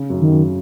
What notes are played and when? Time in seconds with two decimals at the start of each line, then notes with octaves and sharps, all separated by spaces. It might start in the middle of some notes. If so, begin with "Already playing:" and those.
Already playing: C#3
0.10 F#2
0.21 D#3
0.30 F#2